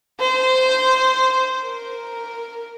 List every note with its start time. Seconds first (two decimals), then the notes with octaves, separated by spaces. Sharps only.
0.21 C5
1.64 A#4